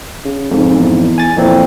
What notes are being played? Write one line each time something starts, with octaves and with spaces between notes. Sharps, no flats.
C#3
F1 F2 G#2
E2
G#5 A6
F2 A#2 E3 C4